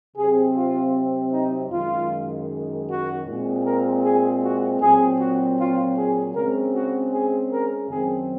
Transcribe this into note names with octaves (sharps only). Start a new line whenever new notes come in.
C3 F#3 C4 G#4
F4
D#4
F#2 D#3 G#3 F4
F#4
A#2 G#3 C4
A#4
G#4
F#4
A#2 F#3 C4 G#4
F#4
F4
G#4
C#3 G#3 C4 A#4
F#4
G#4
A#4
F#2 D#3 F#3 C4 G#4